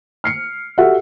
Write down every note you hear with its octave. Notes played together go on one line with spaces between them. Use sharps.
F6 C7 C#7
F#4 G4 A4 E5 F#5